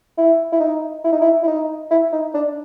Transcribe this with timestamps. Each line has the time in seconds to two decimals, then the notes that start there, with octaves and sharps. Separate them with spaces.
0.18 E4
0.52 E4
0.60 D#4
1.04 E4
1.12 D#4
1.21 E4
1.43 E4
1.47 D#4
1.91 E4
2.13 D#4
2.34 D4